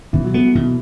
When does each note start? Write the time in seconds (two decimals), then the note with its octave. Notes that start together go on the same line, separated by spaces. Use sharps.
0.13 B2 E3
0.24 F#3
0.34 A3 B3
0.45 F#3
0.55 B2 E3